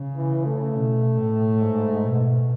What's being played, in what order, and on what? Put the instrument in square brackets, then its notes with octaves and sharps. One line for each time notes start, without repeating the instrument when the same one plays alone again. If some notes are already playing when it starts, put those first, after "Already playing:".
Already playing: [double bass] C#3
[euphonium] E3
A3
[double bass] B2
A2
G#2
B2